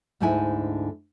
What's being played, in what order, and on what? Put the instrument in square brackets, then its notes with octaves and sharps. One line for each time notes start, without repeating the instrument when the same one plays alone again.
[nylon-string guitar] D2 G#2 D3 D#4 E4 G#5